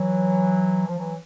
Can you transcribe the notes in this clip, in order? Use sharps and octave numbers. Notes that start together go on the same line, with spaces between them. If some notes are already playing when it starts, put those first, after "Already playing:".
Already playing: E3 F#3
F3
E3 F#3